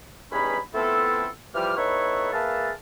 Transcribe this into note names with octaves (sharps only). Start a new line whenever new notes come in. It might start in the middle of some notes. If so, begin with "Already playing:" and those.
E2 G2 C#4 D#4 G#5 B5
A3 B3 C4 E4 F4 A4
E3 F3 G3 G4 F6
B3 D#4 E4 A4 B4 C#5
A#3 G#4 B4 E5 F5 A5